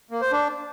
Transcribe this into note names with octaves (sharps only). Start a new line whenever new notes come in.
A#3
C5
D4